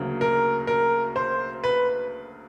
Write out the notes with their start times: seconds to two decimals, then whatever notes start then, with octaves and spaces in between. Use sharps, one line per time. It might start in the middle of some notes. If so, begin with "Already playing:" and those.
Already playing: D2 C#3 F#3 A#3
0.21 A#4
0.67 A#4
1.16 C5
1.64 B4